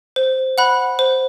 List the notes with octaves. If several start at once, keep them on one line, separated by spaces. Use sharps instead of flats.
C5
F#5 B5 F#6
C5